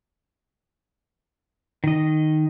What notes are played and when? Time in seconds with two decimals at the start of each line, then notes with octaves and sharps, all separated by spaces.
1.84 D#3 D#5